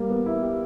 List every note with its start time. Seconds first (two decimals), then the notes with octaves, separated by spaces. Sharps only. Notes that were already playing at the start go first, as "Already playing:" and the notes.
Already playing: G3 A#3
0.10 B3
0.26 E4
0.42 G4